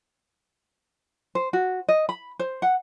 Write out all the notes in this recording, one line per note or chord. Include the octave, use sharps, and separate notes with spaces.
C5
F#4
D#5
B5
C5
F#5